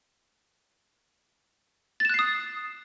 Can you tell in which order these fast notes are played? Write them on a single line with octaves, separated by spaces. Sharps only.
A6 E7 F#6 C7 D#6